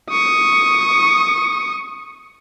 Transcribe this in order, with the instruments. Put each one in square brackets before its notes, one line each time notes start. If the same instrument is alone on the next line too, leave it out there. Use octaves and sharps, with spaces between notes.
[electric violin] C#6 D#6